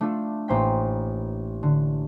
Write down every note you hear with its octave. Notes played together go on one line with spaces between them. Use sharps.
A3 D4 F4 A4
A1 A#3 C5 G5 B6
D3